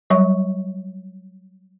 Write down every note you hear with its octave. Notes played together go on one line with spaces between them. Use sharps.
F#3 G3 C#5 C#6